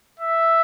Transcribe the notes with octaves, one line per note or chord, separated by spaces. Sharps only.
E5